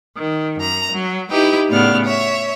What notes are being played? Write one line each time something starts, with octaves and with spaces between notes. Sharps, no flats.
D#3
F#2 A#5
F#3
D#4 E4 G4 B4 G5
A2 C#3 A3 B3 D5 F6
C#5 E5